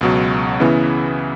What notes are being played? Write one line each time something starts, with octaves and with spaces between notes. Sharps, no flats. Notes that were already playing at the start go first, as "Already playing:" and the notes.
C#2 B2 F#3
C#3 E3 B3 E4